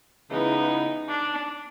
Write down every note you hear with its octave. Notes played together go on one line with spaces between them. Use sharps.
C#3 E3 G#3 B3 D#4 E4
D4